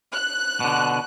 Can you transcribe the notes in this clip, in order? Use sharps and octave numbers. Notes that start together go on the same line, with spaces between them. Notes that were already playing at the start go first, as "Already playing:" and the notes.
F#6
B2 D3